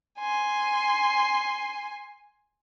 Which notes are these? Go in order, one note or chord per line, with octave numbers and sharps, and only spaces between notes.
G#5 C6